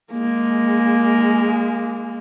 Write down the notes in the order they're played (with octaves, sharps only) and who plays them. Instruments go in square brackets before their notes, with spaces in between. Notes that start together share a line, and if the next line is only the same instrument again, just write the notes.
[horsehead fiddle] G#3 A#3